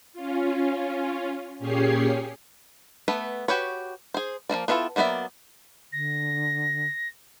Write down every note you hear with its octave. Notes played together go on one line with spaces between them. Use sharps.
C#4 F4
A#2 C#4 G4 G#4 C#5 C7
A3 B3 B4
F#4 G4 B4 C#5
G#4 C5
F3 A3 A#3 D5
B3 D4 E4 F4 A4
F#3 A#3 B3 D5 E5
D3 A#6